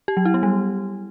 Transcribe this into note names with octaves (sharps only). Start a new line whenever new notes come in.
G4
F#3
E4
B3
G3